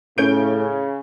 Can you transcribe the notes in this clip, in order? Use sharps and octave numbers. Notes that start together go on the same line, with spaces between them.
A2 C#3 C#4 G6 D7